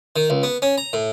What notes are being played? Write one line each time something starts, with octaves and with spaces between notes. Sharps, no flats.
D#3
C#2
B3
C#4
A#5
A2